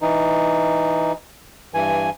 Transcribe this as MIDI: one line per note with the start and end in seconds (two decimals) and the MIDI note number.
0.02 1.12 52
0.02 1.12 63
1.74 2.09 43
1.74 2.09 52
1.74 2.09 80